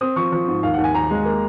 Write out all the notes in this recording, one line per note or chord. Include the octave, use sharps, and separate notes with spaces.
C4 D#6
F3 C#6
F3
G#2
D#2 F5
D#2 F#5
G#5
D#2 A#5
G#3
A#3